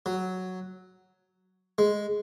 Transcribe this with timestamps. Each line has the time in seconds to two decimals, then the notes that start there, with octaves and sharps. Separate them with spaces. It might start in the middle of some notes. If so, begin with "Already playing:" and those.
0.06 F#3
1.78 G#3